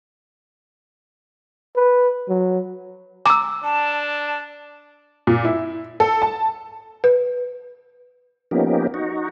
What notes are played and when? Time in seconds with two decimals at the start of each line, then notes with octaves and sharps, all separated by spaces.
1.76 B4
2.29 F#3
3.26 A#5 D6 E6
3.64 D4 A5
5.27 A#2
5.45 E4
6.00 A4
6.22 A5
7.04 B4
8.51 F3 A#3 B3 C#4 D#4 G4
8.94 D#4 F#4